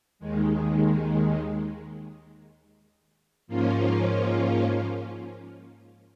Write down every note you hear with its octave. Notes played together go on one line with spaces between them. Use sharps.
D#2 D#3 G#3
G#2 F3 A#3 C#4 F4